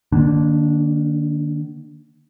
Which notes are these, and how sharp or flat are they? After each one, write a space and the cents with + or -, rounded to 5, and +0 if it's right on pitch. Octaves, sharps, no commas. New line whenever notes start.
D#3 -45 A#3 +0 D4 -15